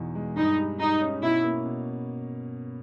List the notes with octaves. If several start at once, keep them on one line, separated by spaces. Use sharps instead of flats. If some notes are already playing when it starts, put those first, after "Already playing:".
Already playing: E2 B2 D#4
G#3
G2 D#4
G3
G2 D#4
C#4
B2 E4
A#3
B2